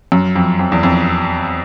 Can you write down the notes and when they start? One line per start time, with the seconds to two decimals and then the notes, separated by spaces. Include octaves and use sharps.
0.12 F#2
0.36 F2
0.59 F2
0.72 E2
0.83 F2